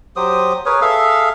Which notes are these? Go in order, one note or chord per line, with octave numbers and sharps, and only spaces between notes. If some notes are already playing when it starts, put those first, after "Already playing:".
F#3 G4 C5 D#6
G#4 A#4 B4 C#5
G#4 A4 E5 F5